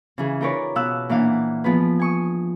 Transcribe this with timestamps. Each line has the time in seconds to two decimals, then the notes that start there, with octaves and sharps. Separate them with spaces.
0.18 C#3 E3 G#4
0.41 D#4 F4 A#4 B4 C#5 D5
0.76 B2 B3 F5 E6 F#6
1.09 A#2 E3 D4 F5 F#5
1.64 F3 B3 G#4 B4
1.99 G#5 C#6 D#6